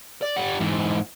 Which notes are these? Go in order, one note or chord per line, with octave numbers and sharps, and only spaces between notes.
D5
G3 F#5
G#2 E3